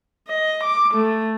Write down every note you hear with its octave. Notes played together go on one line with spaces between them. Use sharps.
D#5
D6
A3